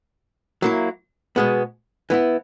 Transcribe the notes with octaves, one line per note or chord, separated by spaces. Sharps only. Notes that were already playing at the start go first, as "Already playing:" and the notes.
F#3 A#3 E4
B2 G#3 B3
E3 B3 E4